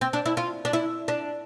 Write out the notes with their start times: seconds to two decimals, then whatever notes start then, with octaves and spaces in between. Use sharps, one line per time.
0.01 C4
0.13 D4
0.26 E4
0.37 F4
0.65 D4
0.73 E4
1.08 D4